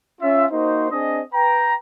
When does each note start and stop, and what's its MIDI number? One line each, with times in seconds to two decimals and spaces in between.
0.21 0.45 61
0.21 0.45 65
0.21 0.45 76
0.51 0.86 58
0.51 0.86 63
0.51 0.86 66
0.51 0.86 72
0.91 1.20 60
0.91 1.20 62
0.91 1.20 68
0.91 1.20 75
1.33 1.74 71
1.33 1.74 79
1.33 1.74 82